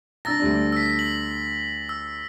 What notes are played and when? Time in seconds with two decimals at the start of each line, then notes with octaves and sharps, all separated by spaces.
0.25 D4 A#5 E6 A6 A#6
0.40 D2 G3 D4
0.72 E6 B6
0.99 F#7
1.89 E6